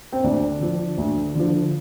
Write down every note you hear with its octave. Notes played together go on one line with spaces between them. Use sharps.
C4
D2 D4
D3 F3
D2
D3 F3